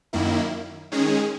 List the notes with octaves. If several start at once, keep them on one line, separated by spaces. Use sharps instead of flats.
F#2 D#3 A#3 E4
D#3 G#3 C#4 G#4